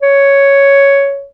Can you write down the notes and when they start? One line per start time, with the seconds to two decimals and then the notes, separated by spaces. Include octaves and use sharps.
0.02 C#5